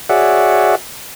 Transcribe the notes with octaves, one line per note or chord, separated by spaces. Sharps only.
F#4 G#4 C#5 D5 E5 F#5